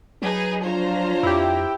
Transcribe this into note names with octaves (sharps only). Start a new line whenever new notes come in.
F#3 D#4 G#4 B4
F3 D4 F4 C5 C#5 A#5
F2 E4 G4